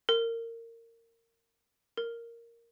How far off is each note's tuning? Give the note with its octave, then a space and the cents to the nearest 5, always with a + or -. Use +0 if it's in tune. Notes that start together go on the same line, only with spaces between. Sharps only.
A#4 -20
A#4 -5